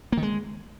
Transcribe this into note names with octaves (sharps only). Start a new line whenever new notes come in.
A#3
D#3
G#3